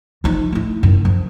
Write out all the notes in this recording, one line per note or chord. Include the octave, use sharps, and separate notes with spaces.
F3 D#4
A3 E4
F#2 D#3
F3